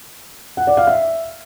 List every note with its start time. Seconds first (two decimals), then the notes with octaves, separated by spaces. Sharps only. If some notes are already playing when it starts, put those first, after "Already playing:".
0.57 F#5
0.67 D5
0.77 F5
0.87 E5